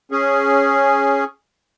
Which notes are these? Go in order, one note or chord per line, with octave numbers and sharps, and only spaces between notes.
C#4 G#4